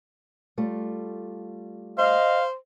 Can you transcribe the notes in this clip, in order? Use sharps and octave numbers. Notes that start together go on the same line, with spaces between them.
G3 A3 F4
C5 D#5 F5